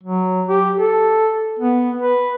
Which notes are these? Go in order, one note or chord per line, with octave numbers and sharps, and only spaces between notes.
F#3
G4
A4
B3
B4